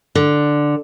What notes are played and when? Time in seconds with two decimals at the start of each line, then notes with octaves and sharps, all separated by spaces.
0.15 D3